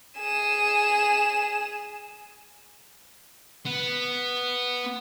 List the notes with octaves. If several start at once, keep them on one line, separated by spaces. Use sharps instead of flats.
G#4 E7
B3